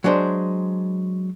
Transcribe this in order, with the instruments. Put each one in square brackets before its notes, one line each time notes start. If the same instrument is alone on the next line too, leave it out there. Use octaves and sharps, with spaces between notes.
[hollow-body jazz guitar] F#3 G#3 D4 C5